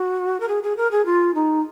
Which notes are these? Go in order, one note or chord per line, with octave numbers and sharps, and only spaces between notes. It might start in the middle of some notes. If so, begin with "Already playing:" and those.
Already playing: F#4
A#4
G#4
G#4
A#4
G#4
F4
D#4